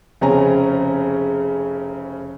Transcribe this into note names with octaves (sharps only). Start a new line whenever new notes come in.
F1 C#3 C4 C#4 G#5 A#5